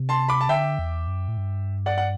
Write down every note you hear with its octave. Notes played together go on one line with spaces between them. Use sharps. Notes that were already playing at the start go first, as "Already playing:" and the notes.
Already playing: C3
A5 C6
B5 D6
A5
D3 E5 G5
E2
F#2
A2
G2
D5 F#5
F#5